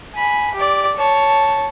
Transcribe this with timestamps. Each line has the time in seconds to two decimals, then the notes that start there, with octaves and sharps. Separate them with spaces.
0.14 G#5 B5
0.55 G4 D5
0.96 C#5 A5